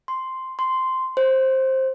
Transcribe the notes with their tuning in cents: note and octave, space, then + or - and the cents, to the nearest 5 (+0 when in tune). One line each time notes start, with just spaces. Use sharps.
C6 +0
C6 -5
C5 +10